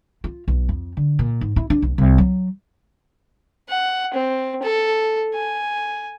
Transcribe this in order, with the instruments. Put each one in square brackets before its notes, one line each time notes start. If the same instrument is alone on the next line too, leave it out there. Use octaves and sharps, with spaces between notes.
[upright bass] F4
B1
F2
D3
A#2
G#2
E4
D4
B1
C2
F#3
[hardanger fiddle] F#5
C4
A4
G#5